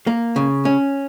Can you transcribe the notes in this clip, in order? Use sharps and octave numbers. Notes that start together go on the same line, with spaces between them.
A#3
C#3
C#4